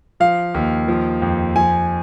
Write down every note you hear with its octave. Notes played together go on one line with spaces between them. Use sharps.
F3 F5
D#2
F3
F2
F3 G#5